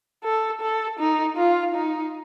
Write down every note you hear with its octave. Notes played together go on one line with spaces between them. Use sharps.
A4
A4
D#4
F4
D#4